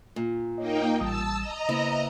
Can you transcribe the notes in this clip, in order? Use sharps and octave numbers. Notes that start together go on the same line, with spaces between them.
A#2
A#3 D#4 C#5 D#5 G5
A1 G3 A5 D#6 E6
D#5 A#5
C#3 A#3 B3 E4 C5